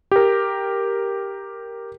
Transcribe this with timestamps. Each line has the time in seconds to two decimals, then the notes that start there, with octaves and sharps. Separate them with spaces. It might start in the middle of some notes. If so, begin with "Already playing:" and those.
0.11 G4 A#4